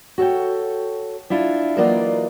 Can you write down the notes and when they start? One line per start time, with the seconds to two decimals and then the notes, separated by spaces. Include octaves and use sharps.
0.18 F#4 A4 C#5 G5
1.30 D4 E4 F4
1.77 E3 F#3 A#3 F4 D5 D#5